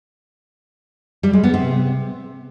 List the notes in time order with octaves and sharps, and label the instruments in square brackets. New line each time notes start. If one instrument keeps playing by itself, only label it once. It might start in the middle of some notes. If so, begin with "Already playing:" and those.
[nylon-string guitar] G3
G#3
B3
C3